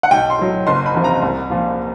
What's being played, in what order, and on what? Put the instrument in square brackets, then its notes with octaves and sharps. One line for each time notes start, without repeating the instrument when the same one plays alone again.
[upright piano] F#5
B1 G5
C6
A2 F#3
F#1 C6
B5
E2 C3 F3
A#5
C2
A#2 F3